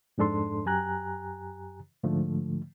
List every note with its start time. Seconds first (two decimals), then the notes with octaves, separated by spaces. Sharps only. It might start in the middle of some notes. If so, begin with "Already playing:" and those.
0.18 F2 G#2 D4 A4 C6
0.66 F#2 G4 G#5 A#5 F#6
2.03 G#2 D3 F3 A3